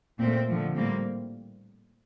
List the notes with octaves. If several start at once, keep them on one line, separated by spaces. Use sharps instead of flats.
A#2 A3 C4
D3 F3 A3
A2 G3 A#3 C4